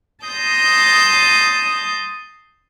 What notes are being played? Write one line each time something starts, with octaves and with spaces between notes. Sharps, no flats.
A5 C6 D#6 G6 A#6